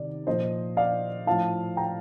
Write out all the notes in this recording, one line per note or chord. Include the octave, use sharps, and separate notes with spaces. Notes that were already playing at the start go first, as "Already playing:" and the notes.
Already playing: C3 D#3 D5
A#2 F3 C5 D#5
D5 F5
A2 F3 F5 A5
G5 A#5